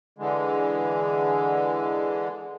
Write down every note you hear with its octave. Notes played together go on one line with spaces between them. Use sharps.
D3 E3 G#3